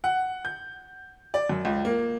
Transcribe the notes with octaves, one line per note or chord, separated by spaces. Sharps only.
F#5
G6
D5
F#2
C#2
A#3